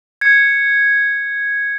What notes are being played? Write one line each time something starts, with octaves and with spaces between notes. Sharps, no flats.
G#6 C#7